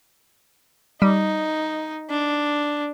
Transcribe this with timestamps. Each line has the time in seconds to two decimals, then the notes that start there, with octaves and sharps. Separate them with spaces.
1.02 G3 D#4
2.10 D4